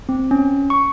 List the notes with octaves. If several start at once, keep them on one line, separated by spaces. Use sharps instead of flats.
C4
C#4
C#6